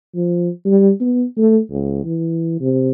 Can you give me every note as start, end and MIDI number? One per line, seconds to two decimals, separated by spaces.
0.15 0.49 53
0.65 0.91 55
1.00 1.25 59
1.38 1.59 57
1.71 2.03 37
2.05 2.56 52
2.61 2.91 48